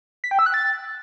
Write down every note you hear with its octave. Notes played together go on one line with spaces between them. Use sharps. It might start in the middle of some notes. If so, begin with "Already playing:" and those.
B6
G5
E6
F#6
A6